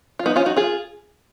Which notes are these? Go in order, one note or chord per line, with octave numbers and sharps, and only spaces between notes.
F4
B3 D#4
C#4 F4
D#4 F#4
F4 G#4